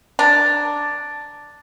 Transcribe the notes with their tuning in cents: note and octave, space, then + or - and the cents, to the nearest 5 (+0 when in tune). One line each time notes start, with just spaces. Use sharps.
D4 +0 A#5 -10